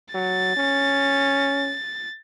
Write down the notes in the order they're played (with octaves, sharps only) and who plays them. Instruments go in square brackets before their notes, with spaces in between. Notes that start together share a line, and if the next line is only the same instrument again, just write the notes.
[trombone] F#3 [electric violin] A6
[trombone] C#4